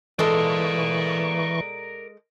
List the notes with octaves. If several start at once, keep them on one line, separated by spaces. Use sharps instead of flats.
E3 G#3 A4 A#4 D5 C#6